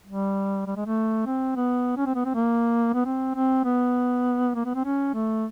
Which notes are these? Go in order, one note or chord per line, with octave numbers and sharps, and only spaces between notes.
G3
G3
G#3
A3
C4
B3
C#4
C4
B3
C4
A#3
B3
C4
C4
B3
A#3
B3
C4
C#4
A3